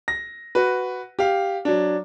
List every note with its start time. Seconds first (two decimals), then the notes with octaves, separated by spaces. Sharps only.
0.08 A#6
0.55 F#4 B4
1.19 G4 F5
1.65 F#3 D4